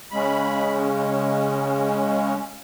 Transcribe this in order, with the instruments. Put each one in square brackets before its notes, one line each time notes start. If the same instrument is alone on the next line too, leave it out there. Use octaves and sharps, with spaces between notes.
[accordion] C#3 G#3 C#4 B5